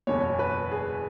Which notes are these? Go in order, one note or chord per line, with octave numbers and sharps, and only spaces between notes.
F#1 E2 B2 C#5
B4
G#4